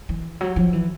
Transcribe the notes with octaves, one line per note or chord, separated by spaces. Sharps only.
E3
F#3
F3
E3